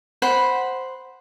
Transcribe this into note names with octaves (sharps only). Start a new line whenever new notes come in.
C5 F#5 B5